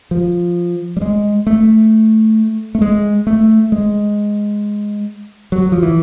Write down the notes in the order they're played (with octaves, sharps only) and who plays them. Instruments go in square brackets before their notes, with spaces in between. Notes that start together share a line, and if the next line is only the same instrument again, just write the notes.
[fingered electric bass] F3
G3
G#3
A3
A3
G#3
A3
G#3
F#3
F3
E3